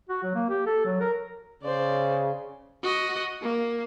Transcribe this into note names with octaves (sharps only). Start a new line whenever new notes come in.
F#4
F#3
A#3
G4
A4
F#3
A#4
C#3 C5 D5
F#4 D#5
A#3